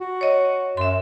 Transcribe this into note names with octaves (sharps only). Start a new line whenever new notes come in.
F#4
C#5 D#5
F#2 E5 C6